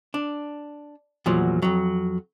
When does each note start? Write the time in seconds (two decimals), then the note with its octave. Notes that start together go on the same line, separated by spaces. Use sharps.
0.14 D4
1.26 E2 A#2 F3 F#3
1.62 F2 F#3